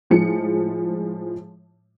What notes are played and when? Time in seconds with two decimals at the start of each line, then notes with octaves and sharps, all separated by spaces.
0.10 A2 F3 G#3 C#7